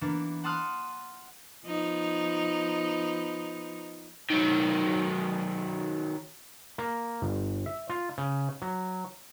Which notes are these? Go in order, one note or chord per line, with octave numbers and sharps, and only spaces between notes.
E3 A#3 B3 D4
F#5 A5 C6 D#6 F6 F#6
F3 B3 D#4
D#3 F#3
A#3
G1
E5
F4
C#3
F#3